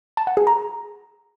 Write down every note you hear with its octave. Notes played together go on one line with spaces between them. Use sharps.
A5
F#5
G#4
A#5